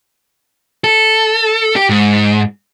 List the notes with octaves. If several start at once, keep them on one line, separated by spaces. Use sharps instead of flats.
A4
G4
G#2